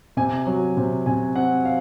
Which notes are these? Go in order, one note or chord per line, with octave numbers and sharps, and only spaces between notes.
C3 G#5
F#3
C3
C3 G#5
C4 F#5
F5